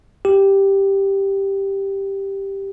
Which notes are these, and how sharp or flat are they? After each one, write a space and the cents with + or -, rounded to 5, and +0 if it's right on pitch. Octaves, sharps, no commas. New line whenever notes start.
G4 +0